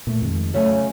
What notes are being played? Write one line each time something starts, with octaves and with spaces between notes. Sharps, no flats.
A#2 A3
F2 D#3 G#3
C#3 F#3 A3 G#5